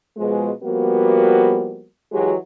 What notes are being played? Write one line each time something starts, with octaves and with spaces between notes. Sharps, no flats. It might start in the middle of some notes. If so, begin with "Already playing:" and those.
B2 F3 G#3
F3 G3 A#3 B3 F#4
E3 F#3 G#3 F#4 G4